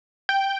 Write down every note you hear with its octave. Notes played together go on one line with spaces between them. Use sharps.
G5